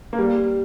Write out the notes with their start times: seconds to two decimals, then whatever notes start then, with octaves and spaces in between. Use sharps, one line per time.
0.13 A#3
0.18 G3